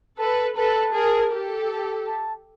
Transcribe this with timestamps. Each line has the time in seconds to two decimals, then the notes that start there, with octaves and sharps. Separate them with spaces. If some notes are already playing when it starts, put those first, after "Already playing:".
0.18 A4 B4 A5
0.56 A4 B4 A5
0.94 G#4 A#4
1.31 G4 A4
1.69 A5
2.07 A5